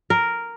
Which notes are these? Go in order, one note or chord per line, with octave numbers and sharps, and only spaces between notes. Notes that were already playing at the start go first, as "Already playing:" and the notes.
A#4